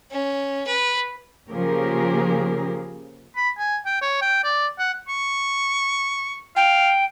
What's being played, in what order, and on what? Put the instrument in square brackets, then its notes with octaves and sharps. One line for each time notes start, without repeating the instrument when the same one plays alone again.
[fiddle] C#4
B4
[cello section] C#3 F3 A#3 G4 G#4 A#4
[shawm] B5
G#5
G5
C#5
G5
D5
F#5
C#6
[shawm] F5 [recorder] G5